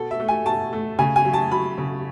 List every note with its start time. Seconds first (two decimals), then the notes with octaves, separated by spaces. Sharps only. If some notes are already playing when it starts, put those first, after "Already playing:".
Already playing: B2 B3 A4
0.11 E5
0.20 A3
0.28 G#5
0.46 B2 A5
0.73 A3
0.99 C#3 G#5
1.16 G#5
1.25 F#3
1.33 A5
1.51 F#3 B5
1.78 C#3